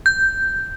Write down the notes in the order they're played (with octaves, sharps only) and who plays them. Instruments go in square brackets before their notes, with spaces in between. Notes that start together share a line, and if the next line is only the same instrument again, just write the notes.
[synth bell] G6